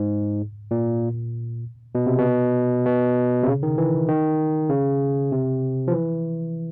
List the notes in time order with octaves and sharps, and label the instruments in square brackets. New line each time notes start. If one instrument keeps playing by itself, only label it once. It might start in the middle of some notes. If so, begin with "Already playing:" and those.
Already playing: [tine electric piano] G#2
A#2
B2
C3
B2
B2
C3
C#3
D#3
E3
D#3
C#3
C3
F3
E3